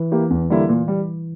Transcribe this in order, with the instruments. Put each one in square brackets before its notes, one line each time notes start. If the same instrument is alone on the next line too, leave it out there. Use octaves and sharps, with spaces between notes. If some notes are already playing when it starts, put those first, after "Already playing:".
Already playing: [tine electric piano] E3
[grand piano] A#3 E4 G4
E2
D3 G3 A#3 E4
A#2
G3